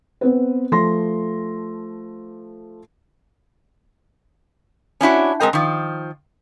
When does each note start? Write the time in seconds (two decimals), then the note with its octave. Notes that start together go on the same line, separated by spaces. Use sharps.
0.21 B3 C4 B4
0.72 F3 A3 C6 A#6
5.01 C#4 D4 E4 F#4
5.40 G#3 C4 A#4 D#5
5.53 D#3 F3